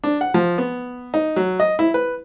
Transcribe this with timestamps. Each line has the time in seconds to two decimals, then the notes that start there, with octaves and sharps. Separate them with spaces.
0.04 D4
0.21 F#5
0.34 F3
0.58 B3
1.14 D#4
1.36 F#3
1.60 D#5
1.79 E4
1.94 B4